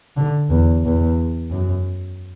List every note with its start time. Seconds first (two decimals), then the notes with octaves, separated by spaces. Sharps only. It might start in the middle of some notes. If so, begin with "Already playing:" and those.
0.16 D3
0.50 E2
0.85 E2
1.51 F#2